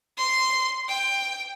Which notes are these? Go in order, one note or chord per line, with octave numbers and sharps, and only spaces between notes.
C6
G5